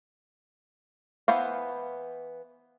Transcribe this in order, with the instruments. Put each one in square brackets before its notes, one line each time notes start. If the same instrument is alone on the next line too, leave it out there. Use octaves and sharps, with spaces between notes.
[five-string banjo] E3 B3 C5 F5